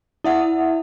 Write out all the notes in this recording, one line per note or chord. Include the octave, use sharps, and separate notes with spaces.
E4 E5 F#5